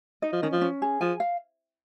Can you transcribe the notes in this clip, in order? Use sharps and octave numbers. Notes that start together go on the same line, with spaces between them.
D#4 D#5
F3
D#3 C#4
F3
C#4
G#4
F3 G#5
F5